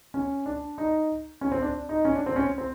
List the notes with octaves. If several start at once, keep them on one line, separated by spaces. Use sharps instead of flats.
C#4
D4
D#4
C#4
C4
D4
D#4
C#4
D4
C4
C#4
C4